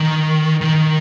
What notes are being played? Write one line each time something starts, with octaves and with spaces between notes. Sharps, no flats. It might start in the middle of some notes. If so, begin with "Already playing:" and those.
Already playing: D#3
D#3